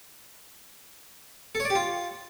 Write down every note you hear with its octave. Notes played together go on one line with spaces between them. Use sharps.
A4
C#5
D5
G4
F4